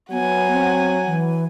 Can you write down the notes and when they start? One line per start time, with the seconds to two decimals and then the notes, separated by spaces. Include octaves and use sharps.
0.11 F#3 B3 F#5 G#5
0.52 C4
1.06 E3